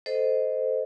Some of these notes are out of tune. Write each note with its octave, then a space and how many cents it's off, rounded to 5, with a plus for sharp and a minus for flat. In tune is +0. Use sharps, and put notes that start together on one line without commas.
A4 +5 C5 -10 D#5 -5